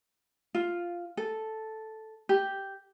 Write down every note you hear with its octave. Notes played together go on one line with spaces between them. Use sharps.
F4
A4
G4